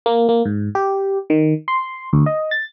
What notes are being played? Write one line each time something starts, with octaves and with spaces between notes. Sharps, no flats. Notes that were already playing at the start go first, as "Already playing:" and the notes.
A#3
A#3
G#2
G4
D#3
C6
D2
D#5
A6